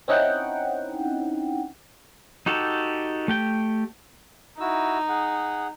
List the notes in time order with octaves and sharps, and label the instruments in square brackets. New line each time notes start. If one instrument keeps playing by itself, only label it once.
[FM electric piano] C4 C#4 D#4 E4 F#5 G5
[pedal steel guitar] D#4 F#4 G4 A4
A3 G4 G5
[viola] D#4 [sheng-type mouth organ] E4 F#4 E6
[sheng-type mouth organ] G#4 F#5